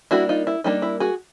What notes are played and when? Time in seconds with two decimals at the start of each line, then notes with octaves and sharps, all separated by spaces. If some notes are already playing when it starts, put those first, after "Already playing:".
0.11 G3 A#3 D4 E4 F#4
0.29 D#4 F4
0.47 E4
0.64 G3 A#3 D4 D#4
0.82 E4
1.00 F#4 G#4